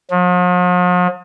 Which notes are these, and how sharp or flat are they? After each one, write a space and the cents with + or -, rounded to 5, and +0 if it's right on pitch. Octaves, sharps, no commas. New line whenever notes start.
F3 +45